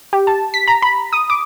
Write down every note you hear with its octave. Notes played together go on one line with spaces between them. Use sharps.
G4
A5
B6
A#5
B5
D#6
D6